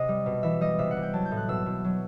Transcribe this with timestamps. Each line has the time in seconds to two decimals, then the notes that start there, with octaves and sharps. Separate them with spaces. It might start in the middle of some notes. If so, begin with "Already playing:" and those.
Already playing: C3 D#5
0.08 G3
0.26 B2
0.43 E3 E5
0.61 G3 D#5
0.79 C3 E5
0.91 F#5
0.97 C3
1.02 G5
1.13 F#3 A5
1.25 G6
1.31 A2
1.37 F#6
1.48 B2 E6
1.66 B2
1.84 F#3